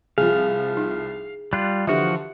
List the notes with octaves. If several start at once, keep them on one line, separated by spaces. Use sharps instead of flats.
C2 F3 G#4 F5
D#4
G3 F4 F#6
D3 E3 F3 F#4 G4 E5